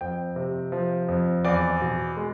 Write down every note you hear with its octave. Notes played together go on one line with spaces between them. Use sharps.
F2 G5
C3
F3
F2
E2 D5
B2
G#3